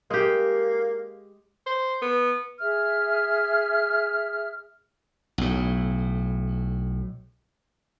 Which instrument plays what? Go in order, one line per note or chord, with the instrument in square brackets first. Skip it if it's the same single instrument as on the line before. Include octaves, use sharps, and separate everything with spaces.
[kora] G#3 G4 [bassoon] A#3
[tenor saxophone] C5
B3
[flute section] G#4 E5 F6
[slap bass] B1 A2